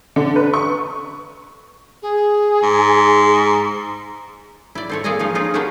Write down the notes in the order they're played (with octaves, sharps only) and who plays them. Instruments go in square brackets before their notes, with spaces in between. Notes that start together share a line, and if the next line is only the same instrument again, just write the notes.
[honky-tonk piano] D3
B4
C#6
[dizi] G#4
[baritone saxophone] G#2
[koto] E4 D5
C4 A4 C#5
A#3 G#4 D5 D#5 G#5 A#5
F3 C#4 D#4 F5
C#4 D#4 F4 G#4
C#4 D4 F#4 G4 A#4 B4